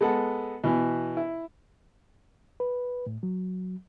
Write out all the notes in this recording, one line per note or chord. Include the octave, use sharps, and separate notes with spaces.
G#3 B3 A4 F#5
B2 E3
E4
B4
A2
F#3